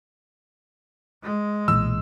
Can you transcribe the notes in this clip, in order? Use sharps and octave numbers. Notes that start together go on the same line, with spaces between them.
G#3
B1 A#2 E3 E6